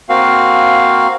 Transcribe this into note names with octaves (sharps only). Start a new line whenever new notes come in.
A#3 C4 F#4 F5